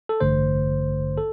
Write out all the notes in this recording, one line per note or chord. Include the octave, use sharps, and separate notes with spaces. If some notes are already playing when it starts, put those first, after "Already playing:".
A4
A1 G2 D3 A3 C5
A4